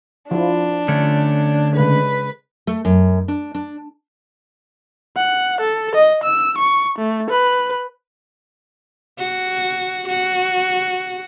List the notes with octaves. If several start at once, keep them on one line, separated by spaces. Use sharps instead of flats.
F3 D4 E4 F4
D3 A3 C#4
C#3 G#3 A4 B4
A3
F#2
D4
D4
F#5
A4
D#5
E6
C#6
A3
B4
F#4
F#4